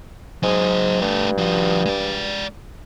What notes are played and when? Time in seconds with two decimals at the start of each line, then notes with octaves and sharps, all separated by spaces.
0.43 G#2 F#3 G#4
1.02 G2 A3 G4
1.38 F3 F#4
1.86 G#3 D5